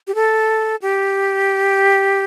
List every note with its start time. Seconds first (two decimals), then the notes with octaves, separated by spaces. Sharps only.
0.07 G4
0.15 A4
0.82 G4